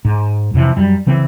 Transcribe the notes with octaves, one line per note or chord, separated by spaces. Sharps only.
G#2
F2 C3 D#3 E3
F#2 G3
C#3 E3 C4